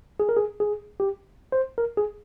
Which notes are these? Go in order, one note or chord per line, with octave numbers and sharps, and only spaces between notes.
G#4
A#4
G#4
G#4
G4
C5
A#4
G#4